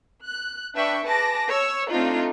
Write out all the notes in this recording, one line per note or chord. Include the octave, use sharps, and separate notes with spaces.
F#6
D4 B4 E5 G5 C#6
G#4 B4 A5 D6 A#6
C#5 E6
A3 C4 D4 D#4 F4